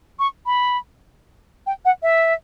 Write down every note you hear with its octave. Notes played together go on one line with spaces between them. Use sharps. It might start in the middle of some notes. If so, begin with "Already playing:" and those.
C#6
B5
G5
F#5
E5